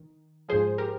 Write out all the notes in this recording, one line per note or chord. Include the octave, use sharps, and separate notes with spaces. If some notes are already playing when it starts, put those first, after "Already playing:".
Already playing: D#3
G#2 F3 G#4 C5
G4 A#4